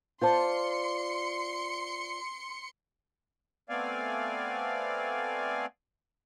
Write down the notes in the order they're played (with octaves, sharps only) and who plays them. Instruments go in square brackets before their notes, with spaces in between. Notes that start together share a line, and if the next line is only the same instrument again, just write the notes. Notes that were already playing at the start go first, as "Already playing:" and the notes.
[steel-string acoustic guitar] F4 C5 D5 [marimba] A5 G6 [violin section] C6 C#7
[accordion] A3 B3 C4 D5 F5 G#5